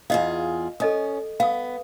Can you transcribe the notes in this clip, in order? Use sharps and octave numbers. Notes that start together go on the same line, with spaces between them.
E2 F4 G#4 D#5 F5
C#4 A4 D#5 D#6
B3 F5 D#6